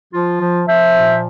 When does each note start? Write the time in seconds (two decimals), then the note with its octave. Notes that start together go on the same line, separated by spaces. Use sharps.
0.12 F3 F4
0.41 F3
0.67 F3 C5 E5
0.96 A#2